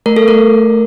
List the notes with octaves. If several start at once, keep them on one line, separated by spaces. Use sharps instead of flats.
A3 A#4
A4
A3 A#4